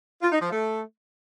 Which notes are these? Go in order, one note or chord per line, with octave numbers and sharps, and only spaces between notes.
F4
D#4
F3
A3